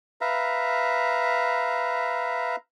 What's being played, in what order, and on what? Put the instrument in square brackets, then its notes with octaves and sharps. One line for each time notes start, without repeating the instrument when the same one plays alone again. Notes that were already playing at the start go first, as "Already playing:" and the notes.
[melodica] B4 E5 F5 A#5